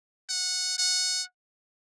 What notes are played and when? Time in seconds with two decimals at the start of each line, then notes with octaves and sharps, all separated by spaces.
0.29 F#5
0.78 F#5